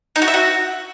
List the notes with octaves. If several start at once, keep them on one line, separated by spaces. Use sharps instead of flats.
D#4
F#4
E5
F#4